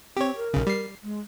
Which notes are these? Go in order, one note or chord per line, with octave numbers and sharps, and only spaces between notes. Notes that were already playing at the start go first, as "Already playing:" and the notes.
C4 G4 C#5
A#4
B1 C#3
G3 C7
G#3